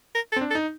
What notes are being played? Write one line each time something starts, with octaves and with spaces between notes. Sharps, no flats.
A#4
A4
C4
D4
A4
D#4